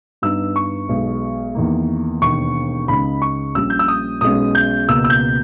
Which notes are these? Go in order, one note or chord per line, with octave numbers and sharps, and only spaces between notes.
G2 G3 B3 D#4 E6
C#6
B1 B2 G#3
E2 D#3 A#3
E1 D#2 D#3 C#6
C#2 C#3 G#3 D#4 B5
C#6
A#1 A#2 G3 C#4 E6
G6
E6
D#6
B1 B2 G#3 C#4 D#6
G6
C#2 B2 A#3 E6
E6
G6